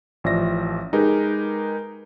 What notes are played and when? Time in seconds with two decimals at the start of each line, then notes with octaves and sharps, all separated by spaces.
0.24 A1 F3 D5 E5 A#6
0.93 G#3 D#4 G4 G#4 A#4 B4